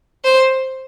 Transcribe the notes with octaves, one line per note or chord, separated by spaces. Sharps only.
C5